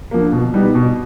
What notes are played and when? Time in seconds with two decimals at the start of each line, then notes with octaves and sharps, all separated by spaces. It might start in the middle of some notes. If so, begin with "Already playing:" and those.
0.11 D3 F3 A#3
0.32 B2
0.54 G3 B3 D#4
0.75 B2